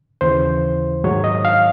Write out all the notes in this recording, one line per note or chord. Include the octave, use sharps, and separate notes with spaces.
D#2 C#3 E3 C5
G#2 D#3 F#3 C#5
D#5
F5